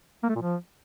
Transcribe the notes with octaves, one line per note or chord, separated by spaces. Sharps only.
A#3
A3
A#2
F3